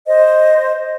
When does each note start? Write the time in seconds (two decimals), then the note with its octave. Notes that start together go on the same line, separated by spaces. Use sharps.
0.06 C5 D#5